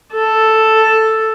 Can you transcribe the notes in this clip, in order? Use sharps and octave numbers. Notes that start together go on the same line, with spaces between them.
A4